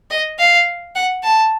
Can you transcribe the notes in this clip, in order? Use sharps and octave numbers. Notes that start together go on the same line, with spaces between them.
D#5
F5
F#5
A5